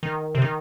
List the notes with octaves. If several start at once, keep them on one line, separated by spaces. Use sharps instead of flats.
D#3
C3
D#3